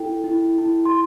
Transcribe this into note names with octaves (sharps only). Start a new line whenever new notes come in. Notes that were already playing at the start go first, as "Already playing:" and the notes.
Already playing: E4 A4 G5
E4
E4
C6